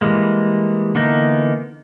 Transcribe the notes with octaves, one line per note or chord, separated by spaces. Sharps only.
E3 G3 G#3 A#3
D3 E3 A#3 B3 D#4